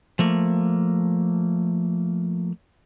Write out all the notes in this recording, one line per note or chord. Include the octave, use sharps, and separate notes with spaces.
F3 A3 A#3